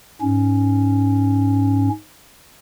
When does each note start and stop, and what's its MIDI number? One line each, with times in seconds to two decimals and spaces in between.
0.21 1.89 44
0.21 1.89 61